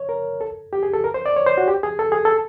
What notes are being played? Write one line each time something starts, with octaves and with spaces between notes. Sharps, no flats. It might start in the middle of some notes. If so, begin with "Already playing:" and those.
Already playing: C#5
A#4
A4
G4
G#4
A4
A#4
C5
D5
C#5
C5
F#4
G4
G#4
A4
G#4
A4